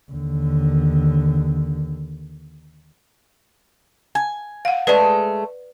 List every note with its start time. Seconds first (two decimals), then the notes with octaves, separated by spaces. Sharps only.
0.12 D#2 D3
4.15 G#5
4.65 F5 F#5
4.87 G#3 A3 B4 D5